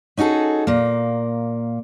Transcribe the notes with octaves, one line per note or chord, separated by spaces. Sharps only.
C#4 D#4 F#4 G#4 A4
A#2 A#3